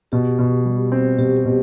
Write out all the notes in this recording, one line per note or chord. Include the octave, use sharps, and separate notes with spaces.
B2 G4
B2
G3
C4
B2 G4
G4
B2